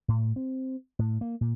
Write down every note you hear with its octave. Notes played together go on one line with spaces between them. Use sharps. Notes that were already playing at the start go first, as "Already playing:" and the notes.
A2
C4
A2
A#3
A#2